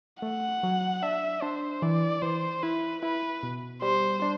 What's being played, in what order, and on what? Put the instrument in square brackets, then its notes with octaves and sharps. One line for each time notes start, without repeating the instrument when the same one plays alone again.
[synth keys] A3 [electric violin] F#5
[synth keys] F#3
[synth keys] D4 [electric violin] E5
[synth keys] D4 [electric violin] C5
[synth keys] E3 [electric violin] D5
[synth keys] E3 [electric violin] C5
[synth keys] E4 [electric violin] B4
[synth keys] E4 [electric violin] B4
[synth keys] B2
[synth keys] G3 [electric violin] C5
[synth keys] D4